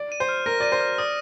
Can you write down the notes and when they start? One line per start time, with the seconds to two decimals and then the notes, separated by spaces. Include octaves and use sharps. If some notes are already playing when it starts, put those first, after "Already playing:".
Already playing: D5
0.12 D#7
0.20 C5
0.29 F6
0.46 A#4 A#6
0.60 D5 D#7
0.72 C5
0.81 F6
0.98 D5 D#6